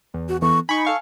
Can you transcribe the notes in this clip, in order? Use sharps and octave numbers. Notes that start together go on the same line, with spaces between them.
E2
F#4
E3 B3 A4 C#6
D#4 G#5 B5 C#6
A4 F5 C#6